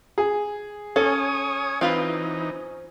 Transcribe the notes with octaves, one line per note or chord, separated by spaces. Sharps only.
G#4
C#4 A4 C#5 G#5 D#6
E3 C4 D#4 F4 B4